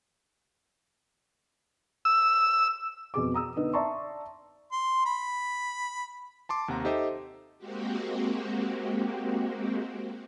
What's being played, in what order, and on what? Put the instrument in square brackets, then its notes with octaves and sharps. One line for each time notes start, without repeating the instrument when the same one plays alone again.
[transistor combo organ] E6
[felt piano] F2 B2 G#4 D6
A#5 D#6 E6
D3 B3 D#4
D5 E5 A5 A#5 C6 C#6
[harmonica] C6
B5
[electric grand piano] A5 C6 D6
D#2 C3 F#5 A#5
D#4 G4 A4 C5 D#5 E5
[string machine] G#3 A#3 C4 F#4 G4